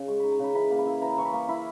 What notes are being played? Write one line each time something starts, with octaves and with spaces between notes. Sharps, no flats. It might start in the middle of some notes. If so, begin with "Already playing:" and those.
Already playing: C#3
G#3 C#6
D#4 B5
A#5
C#3 B5
E3 B5
A#3
B5
E4
E3 A#5
E3 C#6
B5
A#3
E4 B5